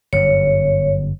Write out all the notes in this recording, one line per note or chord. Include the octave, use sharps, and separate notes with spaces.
G1 F#2 C#5